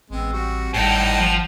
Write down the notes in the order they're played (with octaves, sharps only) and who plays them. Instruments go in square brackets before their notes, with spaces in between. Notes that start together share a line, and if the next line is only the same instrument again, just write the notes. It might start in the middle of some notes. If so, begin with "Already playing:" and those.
[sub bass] A1 [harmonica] G#3 B3 [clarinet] C4
[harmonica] G3 F#4
[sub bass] G#1 [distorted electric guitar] A2 D#4 [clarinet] G3 [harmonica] F#5 G5 A5
[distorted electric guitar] F3